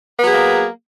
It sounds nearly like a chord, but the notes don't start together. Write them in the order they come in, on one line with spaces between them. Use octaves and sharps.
B3 F#3 G#4 A#3